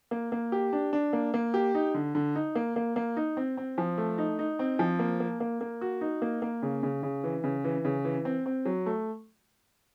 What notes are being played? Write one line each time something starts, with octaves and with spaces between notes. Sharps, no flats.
A#3
A#3
G4
D4
D4
A#3
A#3
G4
D#4
D3
D3
D#4
A#3
A#3
A#3
D#4
C4
C4
F3
A3
D#4
D#4
C4
F3
A#3
A#3
A#3
A#3
F#4
D#4
A#3
A#3
C#3
C#3
C#3
E3
C#3
E3
C#3
E3
C4
C4
F#3
A3